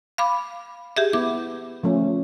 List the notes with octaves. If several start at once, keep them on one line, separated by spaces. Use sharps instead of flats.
F5 B5 D6
G4 G#4 E5
B3 E4 D6
F3 A3 C#4